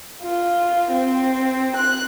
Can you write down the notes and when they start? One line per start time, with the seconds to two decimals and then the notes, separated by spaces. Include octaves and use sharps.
0.23 F4
0.92 C4
1.77 F#6